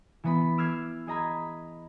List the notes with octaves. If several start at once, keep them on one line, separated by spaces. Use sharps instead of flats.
E3 B3 B5
D6 E6 F6 G#6 C7 C#7
G#4 D#5 A#5 B5 G#6